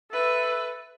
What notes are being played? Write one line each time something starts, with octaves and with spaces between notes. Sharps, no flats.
A4 B4 E5